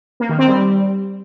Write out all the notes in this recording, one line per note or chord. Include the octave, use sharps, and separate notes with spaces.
A#3
D#3
C4
G3